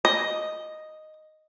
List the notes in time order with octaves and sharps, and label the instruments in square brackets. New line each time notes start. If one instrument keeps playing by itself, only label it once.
[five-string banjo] D#5